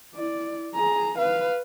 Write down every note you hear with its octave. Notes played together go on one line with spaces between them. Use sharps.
E4 D5
G#4 A#5
B4 F5